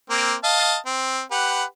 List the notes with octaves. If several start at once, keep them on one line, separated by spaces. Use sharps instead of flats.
A#3 C4
D#5 F5 A5
C4
G4 B4 F#5